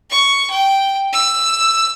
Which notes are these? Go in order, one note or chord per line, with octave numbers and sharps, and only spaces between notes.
C#6
G5
E6